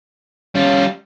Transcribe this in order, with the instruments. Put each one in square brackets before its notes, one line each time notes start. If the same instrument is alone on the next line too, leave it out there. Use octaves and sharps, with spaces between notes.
[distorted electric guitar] G3 F4 [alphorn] C#4